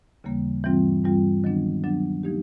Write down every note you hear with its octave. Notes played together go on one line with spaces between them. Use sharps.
D#2 C#3 E3 G3 A#3
G2 E3 G3 C4 F4
G2 E3 G3 C4 F4
D#3 F#3 B3 D4
D#3 F#3 B3 D4
F3 A#3 D#4 G4